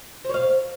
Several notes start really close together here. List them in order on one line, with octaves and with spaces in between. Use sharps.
C5 C#5 F5